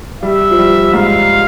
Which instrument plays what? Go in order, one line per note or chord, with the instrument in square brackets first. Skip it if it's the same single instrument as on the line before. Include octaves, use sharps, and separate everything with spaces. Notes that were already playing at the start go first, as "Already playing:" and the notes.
[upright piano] G3 [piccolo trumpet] E5
[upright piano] F3
G3
[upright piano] G#2 [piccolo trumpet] F5